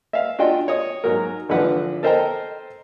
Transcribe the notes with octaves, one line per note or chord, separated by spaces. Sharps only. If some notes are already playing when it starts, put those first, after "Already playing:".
E5 F5
D4 F4 F#4 D#5 G5
C#5 D#5 D#6
G#2 F#3 A#4
G#1 D3 E3 F3 B4 F#5
A4 A#4 C5 D#5 G5 A#5